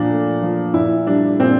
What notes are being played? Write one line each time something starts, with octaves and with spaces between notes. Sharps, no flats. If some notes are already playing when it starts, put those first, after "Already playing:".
Already playing: A#2 F3 D4
A3
F3
A#2 E4
G3 D4
A#2 C4